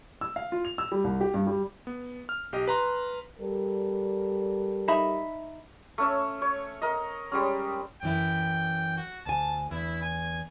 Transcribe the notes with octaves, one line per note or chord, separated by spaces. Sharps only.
E6
F5
F4
F7
E6
G3
C2
G4
G2
G3
B3
F6
B1 G4 D#5
B4 A#5 C6
G3 A4 A#4
D#4 E5 B5
A3 C#4 C#5 E6
C#5
A#4 D#5
G3 G#3 C#4
F#2 E3 E4 G5
F#4
D2 G#5 A5
E2 E4
G#5